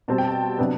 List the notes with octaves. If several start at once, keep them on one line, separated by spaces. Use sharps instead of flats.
B2 G3 C4 A5
G5
A5
C3 F#3 B3 D4